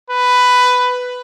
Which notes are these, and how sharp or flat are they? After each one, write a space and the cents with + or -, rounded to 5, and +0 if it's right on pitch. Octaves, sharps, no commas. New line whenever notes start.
B4 +10